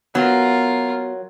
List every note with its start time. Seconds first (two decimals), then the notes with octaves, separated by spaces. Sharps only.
0.15 F#3 B3 F4 F#4 A#4